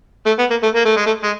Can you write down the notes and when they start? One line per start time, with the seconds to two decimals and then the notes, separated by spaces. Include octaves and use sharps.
0.26 A3
0.39 B3
0.50 A#3
0.63 A3
0.75 A#3
0.86 A3
0.96 G#3
1.06 A3
1.23 G#3